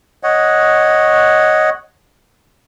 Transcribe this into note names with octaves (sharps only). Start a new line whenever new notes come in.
C#5 D#5 F#5